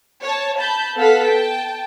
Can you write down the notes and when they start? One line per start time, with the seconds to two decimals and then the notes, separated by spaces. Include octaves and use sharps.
0.23 C#5 A5
0.59 A5 B5 G6
0.97 B3 A4 F5 F#5 B6
1.26 G5 A5